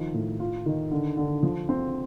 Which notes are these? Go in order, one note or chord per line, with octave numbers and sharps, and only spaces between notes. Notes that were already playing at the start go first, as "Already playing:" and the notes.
Already playing: D#3 F3
A2
F4
D#3
D3
D3
F3
C4